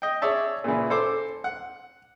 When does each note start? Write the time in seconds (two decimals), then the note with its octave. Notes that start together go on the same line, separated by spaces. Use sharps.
0.02 D#5 G5
0.22 G#4 C#5 D5 E5 A5
0.64 A#2 C#3 E3
0.90 A4 C5 D6
1.44 F#5